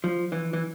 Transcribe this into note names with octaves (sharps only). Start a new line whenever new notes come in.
F3
E3
E3